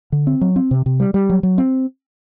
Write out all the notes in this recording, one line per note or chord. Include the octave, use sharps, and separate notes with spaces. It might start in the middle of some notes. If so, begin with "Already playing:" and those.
D3
C4
F#3
C4
C3
C3
G3
G3
F#3
F#3
C4